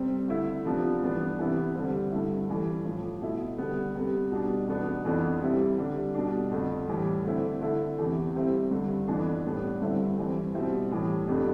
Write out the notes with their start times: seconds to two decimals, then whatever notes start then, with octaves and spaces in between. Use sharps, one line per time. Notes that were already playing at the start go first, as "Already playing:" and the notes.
Already playing: C3 G3 C4
0.28 D3 A3 E4
0.65 C3 F3 B3 D4
1.02 G2 E3 B3 D4
1.39 C3 E3 B3 E4
1.75 D3 G3 C4
2.11 G2 D3 A3 E4
2.48 G2 E3 G3
2.85 A2 F3 A3
3.22 B2 A3 E4
3.58 D3 G3 B3
3.95 C3 G3 B3
4.32 B2 G3 D4
4.68 E2 B2 B3 D4
5.05 F2 E3 B3 D4
5.41 C3 G3 C4 E4
5.78 D3 G3 D4
6.15 B2 G3 D4
6.51 F2 D3 A3
6.87 A2 E3 G3
7.24 D3 A3 C4 E4
7.61 D3 A3 E4
7.98 E2 C3 E3 A3
8.34 C3 G3 C4 E4
8.71 G2 D3 A3
9.08 F2 E3 B3 D4
9.44 A2 G3 B3 D4
9.81 G2 D3 G3 C4 E4
10.17 G2 E3 G3 C4
10.54 B2 G3 C4 E4
10.91 A2 E3 G3
11.28 F2 C3 G3 B3 D4